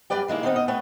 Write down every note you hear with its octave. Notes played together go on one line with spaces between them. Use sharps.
F#2 G3 B4 D5 G5
D#3 G#3 A#3 E4
D#3 B3 C4 D#4
D#5
A3 B4 C#5 G5